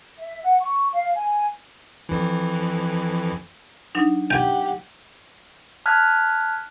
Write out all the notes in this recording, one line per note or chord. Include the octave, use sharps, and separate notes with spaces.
E5
F#5
C#6
F5
G#5
F2 E3
F#3 D4 D#4
G4 F#5 G5
A5 F6 F#6 G#6 B6